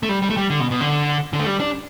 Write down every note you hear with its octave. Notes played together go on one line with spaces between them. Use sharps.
A3
G3
G3
A3
G3
D3
B2
B2
D3
D3
A3
G3
D4